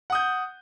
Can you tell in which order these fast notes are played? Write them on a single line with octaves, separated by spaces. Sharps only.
F#5 D#6 G6